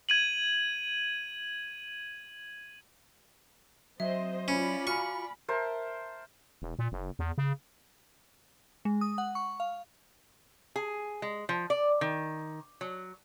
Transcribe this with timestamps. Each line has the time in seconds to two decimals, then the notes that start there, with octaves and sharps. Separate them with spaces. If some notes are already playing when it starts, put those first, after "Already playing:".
0.09 G#6 D#7 F#7
4.00 F#3 C4 C5 D#5 E5
4.48 C#4 F4 D5 B5
4.87 F#4 F5 G#5 A#5 C#6 F6 C#7
5.48 A#4 C5 E5 A5
6.62 E1
6.79 A#2
6.92 F#1
7.19 E2
7.38 C#3
8.85 G#3
9.01 D#6
9.18 F#5
9.35 C#6
9.60 F5
10.76 G#4
11.22 G#3
11.49 F3
11.70 D5
12.01 D#3
12.81 F#3